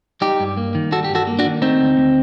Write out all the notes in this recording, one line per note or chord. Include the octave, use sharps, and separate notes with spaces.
G3 D#4 G4
G2
A#3
D#3
G3 F#4 A4
G2 G4
F#4 A4
A#3
D4 F#4
D#3
A3 C4 D#4
D2
D2